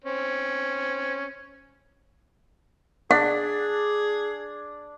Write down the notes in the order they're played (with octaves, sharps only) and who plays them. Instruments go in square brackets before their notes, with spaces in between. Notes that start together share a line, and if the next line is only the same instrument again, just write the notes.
[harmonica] C4 C#4
[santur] D4 [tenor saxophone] G#4 [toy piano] F#5